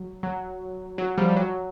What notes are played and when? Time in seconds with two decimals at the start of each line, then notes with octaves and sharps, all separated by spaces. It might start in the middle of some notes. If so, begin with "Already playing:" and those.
Already playing: F#3
0.23 F#3
0.98 F#3
1.18 F3 G3
1.29 G3
1.36 F#3